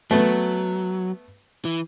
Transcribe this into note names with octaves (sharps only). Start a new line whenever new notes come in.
F#3 A3 B3
E3